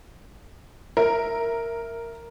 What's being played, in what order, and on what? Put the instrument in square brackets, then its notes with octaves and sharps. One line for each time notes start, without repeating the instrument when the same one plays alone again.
[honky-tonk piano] A#4 E5